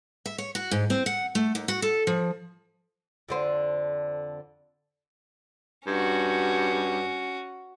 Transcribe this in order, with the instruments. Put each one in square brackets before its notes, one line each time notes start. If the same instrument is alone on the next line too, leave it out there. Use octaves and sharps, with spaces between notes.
[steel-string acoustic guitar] E5
C#5
F#4
G#2
C4
F#5
A3
D#2
F#4
A4
F3
[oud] F2 D3 C5
[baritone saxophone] G2 [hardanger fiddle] C#4 F#4